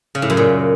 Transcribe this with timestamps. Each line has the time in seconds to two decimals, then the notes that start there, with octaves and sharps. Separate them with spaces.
0.15 C#3
0.22 A2
0.30 F#2
0.37 A#2